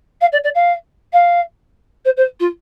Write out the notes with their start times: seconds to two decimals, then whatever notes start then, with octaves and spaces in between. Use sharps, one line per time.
0.21 F5
0.32 D5
0.44 D5
0.55 F5
1.13 F5
2.05 C5
2.17 C5
2.40 F4